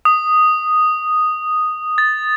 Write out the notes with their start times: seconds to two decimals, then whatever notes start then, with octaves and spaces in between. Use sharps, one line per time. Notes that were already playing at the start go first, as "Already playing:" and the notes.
0.05 D#6
1.98 A6